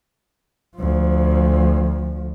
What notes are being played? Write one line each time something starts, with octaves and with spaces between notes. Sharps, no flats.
D2 F3